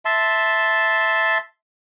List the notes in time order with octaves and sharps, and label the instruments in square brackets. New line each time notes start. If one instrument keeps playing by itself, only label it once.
[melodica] E5 A5 C6